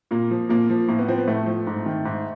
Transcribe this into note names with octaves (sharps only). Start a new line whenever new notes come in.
A#2 A#3
F3
A#2 A#3
F3
A2 A#3
B3
F3 C4
B3
A2 A3
F3
G#2
D#3
G#2